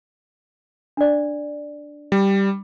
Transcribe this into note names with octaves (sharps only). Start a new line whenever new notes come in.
D4 D5
G3